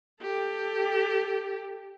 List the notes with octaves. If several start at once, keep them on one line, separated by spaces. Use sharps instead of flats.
G4 A4